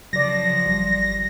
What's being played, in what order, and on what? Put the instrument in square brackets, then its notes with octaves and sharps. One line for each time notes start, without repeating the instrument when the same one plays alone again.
[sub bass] C#3 [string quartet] F3 [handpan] F#3 D5 [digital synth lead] A#6
[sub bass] G1 [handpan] G3